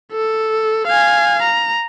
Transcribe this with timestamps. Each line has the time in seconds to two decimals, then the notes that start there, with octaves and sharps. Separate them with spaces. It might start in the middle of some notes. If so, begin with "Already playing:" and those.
0.12 A4
0.87 F5 G#5
1.42 A#5